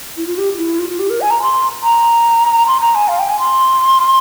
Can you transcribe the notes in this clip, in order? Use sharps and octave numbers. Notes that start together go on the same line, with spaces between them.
E4
F4
G4
E4
F4
F4
G4
A#4
G#5
A#5
C6
A#5
C6
A#5
G#5
F5
G5
G#5
C6